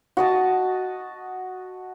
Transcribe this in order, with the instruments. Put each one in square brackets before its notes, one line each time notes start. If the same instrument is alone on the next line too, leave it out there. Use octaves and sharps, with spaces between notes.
[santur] F#4 D#5 A5